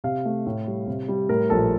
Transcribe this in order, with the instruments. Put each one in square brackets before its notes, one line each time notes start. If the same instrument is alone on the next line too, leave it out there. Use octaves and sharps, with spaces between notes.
[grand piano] C3 F5
A3
A2
G3
C3
G3
A2 A#4
A#1 A4